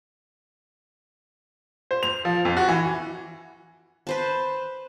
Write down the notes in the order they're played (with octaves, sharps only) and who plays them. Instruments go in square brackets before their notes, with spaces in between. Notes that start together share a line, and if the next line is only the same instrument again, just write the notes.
[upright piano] C5
F7
F3
F2
F#4
E3
[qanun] B4 C5 A5